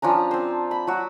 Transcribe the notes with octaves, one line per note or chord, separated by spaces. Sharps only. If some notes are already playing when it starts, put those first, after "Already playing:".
F3 C#4 D4 A#5
C4 C5
B5
F#3 F#4